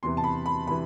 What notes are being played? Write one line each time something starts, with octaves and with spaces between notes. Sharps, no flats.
E2 C3 E3 C6
A5
B5
B5
C3 E3 B5